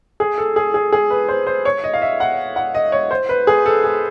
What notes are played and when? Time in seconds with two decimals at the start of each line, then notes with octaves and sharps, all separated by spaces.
0.20 G#4
0.38 A4
0.56 G#4
0.74 G#4
0.92 G#4
1.10 B4
1.28 C5
1.47 C5
1.65 C#5
1.84 D#5
1.94 F5
2.02 E5
2.20 F#5
2.56 F#5
2.75 D#5
2.92 C#5
3.11 C5
3.29 B4
3.47 G#4
3.66 A4
3.84 G#4